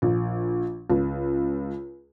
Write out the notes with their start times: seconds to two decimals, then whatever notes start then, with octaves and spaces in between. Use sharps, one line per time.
0.02 A#1
0.90 C#2